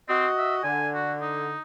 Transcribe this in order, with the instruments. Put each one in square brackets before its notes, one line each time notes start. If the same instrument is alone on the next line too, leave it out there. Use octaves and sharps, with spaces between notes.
[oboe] C4 [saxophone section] F#4 D#5
[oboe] E5
[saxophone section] D3 [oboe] G#5
[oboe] F#4
D#4